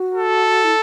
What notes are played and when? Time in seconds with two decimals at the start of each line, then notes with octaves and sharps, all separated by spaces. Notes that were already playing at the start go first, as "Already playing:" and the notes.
Already playing: F#4
0.15 A4
0.64 E4